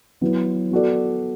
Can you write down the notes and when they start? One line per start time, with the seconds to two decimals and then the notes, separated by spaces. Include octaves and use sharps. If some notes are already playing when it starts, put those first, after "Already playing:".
0.21 F#3 B3 E4
0.71 B3 F#4 A4 D5